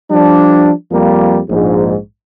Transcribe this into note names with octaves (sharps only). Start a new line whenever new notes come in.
F3 G3 D4
F2 F3 G3 A#3
A#1 G#2